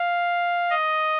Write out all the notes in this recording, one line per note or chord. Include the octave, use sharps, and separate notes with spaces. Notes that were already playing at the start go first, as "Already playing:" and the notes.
Already playing: F5
D#5